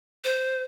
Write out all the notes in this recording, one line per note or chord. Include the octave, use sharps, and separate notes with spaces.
C5